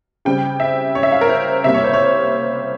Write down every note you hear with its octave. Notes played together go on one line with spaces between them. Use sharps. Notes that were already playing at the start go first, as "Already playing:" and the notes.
C#3 G3 C4 G5
E5
C#5
E5
F5
A#4
C5
C3 G3 A#3 E5
C#5
C5
C#5